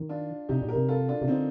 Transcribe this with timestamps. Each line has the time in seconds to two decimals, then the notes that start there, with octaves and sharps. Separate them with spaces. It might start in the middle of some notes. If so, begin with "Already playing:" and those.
Already playing: D#3
0.09 D4 F4
0.49 C3 D#4 G4
0.62 A#2
0.68 G4 A#4
0.75 C3
0.89 F4 A4
1.09 D4 F4
1.22 C3
1.28 D3 C4 D#4